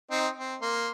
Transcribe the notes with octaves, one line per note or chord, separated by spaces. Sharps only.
C4 D#4
C4
A#3 C6